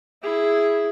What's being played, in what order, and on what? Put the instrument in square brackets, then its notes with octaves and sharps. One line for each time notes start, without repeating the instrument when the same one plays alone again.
[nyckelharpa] E4 G#4